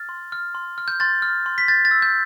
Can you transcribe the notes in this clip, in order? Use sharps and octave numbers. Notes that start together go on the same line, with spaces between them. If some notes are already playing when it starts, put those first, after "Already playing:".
Already playing: F6 A6
C6
F6
C6
F6
G6
C6 A6
F6
C6
B6
G6 A6
A6
E6
G6